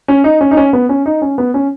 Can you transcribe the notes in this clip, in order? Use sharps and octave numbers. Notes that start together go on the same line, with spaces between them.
C#4
D#4
C#4
D#4
C#4
B3
C#4
D#4
C#4
B3
C#4